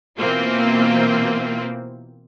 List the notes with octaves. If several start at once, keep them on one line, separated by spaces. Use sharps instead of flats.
B2 E3 A#3 C4 F4